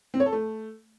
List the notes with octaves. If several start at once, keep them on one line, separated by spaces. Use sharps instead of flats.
C4
C#5
A4
A3